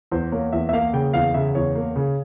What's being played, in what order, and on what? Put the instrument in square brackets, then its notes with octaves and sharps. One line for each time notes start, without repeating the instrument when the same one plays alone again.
[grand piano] E2 C5
A#3 C#5
E2 E5
E5
A#3 F5
C#3 G5
E2 F5
C#3 E5
E2 C#5
A#3
C#3